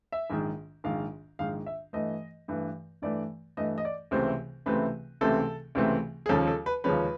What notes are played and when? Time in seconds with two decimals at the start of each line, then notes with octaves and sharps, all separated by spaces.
0.12 E5
0.30 A#1 G#2 D#3
0.84 A#1 G#2 D#3 F5
1.39 A#1 G#2 D#3 F5
1.66 E5
1.93 G2 E3 A3 D#5
2.48 G2 E3 A3
3.02 G2 E3 A3 D5
3.57 G2 E3 A3 D#5
3.78 D#5
3.85 D5
4.11 C#2 C3 E3 A3 C4 C5
4.66 C#2 C3 E3 A3 C4 B4
5.21 C#2 C3 E3 A3 C4 A4
5.75 C#2 C3 E3 A3 C4
6.26 G#4
6.29 D#2 C#3 F3 G#3 C#4 A4
6.47 A4
6.66 B4
6.84 D#2 C#3 F3 G#3 C#4 B4